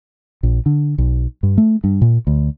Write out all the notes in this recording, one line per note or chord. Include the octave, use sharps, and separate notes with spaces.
A#1
D3
B1
G2
A3
G2
A#2
D2